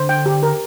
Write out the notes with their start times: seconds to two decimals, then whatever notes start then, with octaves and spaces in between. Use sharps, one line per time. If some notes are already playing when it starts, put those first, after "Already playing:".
Already playing: D3 C5
0.09 G5
0.26 G4
0.43 A#4